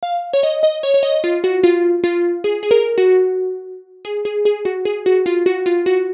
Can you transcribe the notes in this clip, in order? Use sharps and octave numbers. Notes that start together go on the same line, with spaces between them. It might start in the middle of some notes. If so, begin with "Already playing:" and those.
F5
C#5
D#5
D#5
C#5
C#5
D#5
F4
F#4
F4
F4
G#4
G#4
A#4
F#4
G#4
G#4
G#4
F#4
G#4
F#4
F4
F#4
F4
F#4